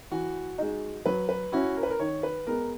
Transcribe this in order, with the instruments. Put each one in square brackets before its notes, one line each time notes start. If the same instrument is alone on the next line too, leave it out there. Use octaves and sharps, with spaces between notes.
[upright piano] E3 [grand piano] F#4
[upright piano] G#3 D#4
[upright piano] F#3 [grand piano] B4
[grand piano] B4
[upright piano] C#4 E4 [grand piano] F#4
[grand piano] A#4
B4
A#4
[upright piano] D#3 [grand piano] C#5
[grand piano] B4
[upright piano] G#3 B3 [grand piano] A#4